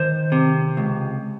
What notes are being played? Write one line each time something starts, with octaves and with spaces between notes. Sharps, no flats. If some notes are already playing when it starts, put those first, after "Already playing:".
Already playing: D#3 C5
C3
C#2